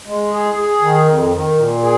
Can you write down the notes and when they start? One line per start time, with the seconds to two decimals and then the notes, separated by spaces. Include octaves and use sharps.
0.07 G#3
0.33 G#4
0.58 G#4
0.82 D#3
1.07 F2
1.32 D#3
1.57 A#2
1.82 G#4